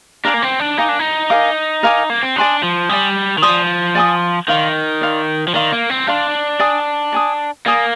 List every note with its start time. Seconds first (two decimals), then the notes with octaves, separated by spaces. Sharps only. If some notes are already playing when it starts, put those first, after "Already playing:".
0.25 D4 A#4 F5 G#5 D6
0.34 A#3
0.42 C4
0.60 D4
0.78 D#4 A#4 F5 G#5 D6
0.89 D4
0.99 D#4
1.30 A#4 F5 G#5 D6
1.83 A#4 F5 G#5 D6
2.10 A#3
2.23 C4
2.36 D4 D5 G#5 C6 D#6
2.63 F3
2.89 G3 D5 G#5 C6 D#6
3.38 D#3
3.42 F3 D5 G#5 C6 D#6
3.95 D5 G#5 C6 D#6
4.48 D#3 D5 F5 C6
5.01 D5 F5 C6
5.48 F3
5.54 D#3 D5 F5 C6
5.72 A#3
5.90 C4
6.07 D4 D5 F5 C6
6.60 D5 G#5 D#6
7.12 D5 G#5 D#6
7.66 A#3 D5 G#5 D#6